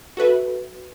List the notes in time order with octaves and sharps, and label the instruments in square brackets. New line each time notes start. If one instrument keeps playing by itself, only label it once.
[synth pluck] F#4 A4 B4 E5